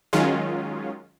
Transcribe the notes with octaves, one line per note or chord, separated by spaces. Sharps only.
D#3 F#3 G#3 C#4 F4